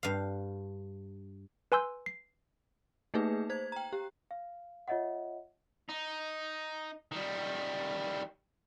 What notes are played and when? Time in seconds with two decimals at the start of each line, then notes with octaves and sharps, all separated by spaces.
0.03 G2 F5
1.72 B4 G#5 C6 E6 G6
2.06 C7
3.14 A3 A#3 D#4 G#4 B4
3.50 C5 G#6
3.72 G5 A#5
3.93 G4
4.31 F5
4.88 F4 C#5 D#5 E5 F#5
5.89 D#4
7.12 D#3 G3